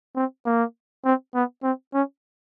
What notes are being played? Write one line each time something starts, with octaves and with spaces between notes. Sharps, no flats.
C4
A#3
C4
B3
C4
C#4